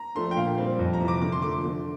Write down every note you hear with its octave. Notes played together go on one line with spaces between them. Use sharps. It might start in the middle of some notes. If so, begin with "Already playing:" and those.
Already playing: A#5
F3 A3 D4 C6
G5
A#2 F5
G3 C4
F2
A#5
C3 E3
D6
D3 D6
C6
F3 A3 D6
D3